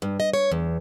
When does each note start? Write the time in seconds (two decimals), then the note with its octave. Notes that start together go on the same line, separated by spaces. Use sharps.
0.02 G2
0.20 D#5
0.33 C#5
0.52 E2